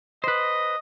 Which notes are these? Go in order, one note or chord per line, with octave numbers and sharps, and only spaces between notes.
B4 C5 D#5